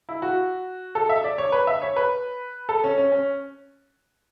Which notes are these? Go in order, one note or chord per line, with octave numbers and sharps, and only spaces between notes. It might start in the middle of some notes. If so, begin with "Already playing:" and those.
E4
F#4
A4
E5
D5
C#5
B4
E5
C#5
B4
A4
C#4
C#4
C#4